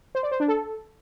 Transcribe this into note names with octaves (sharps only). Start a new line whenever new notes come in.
C5
D5
C5
D4
A4